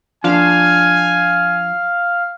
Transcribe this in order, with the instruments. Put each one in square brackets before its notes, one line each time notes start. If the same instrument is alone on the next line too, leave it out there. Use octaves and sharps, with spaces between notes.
[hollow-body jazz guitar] F3 D4 [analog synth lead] F5 [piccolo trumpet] G#5